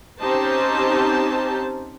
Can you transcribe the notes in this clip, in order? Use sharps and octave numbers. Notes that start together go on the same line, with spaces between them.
C4 C#4 D#4 G4 C5 A5